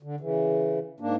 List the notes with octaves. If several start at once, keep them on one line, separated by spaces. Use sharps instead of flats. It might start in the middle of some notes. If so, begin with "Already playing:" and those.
D3
C#3 E3
G#2 A#3 D4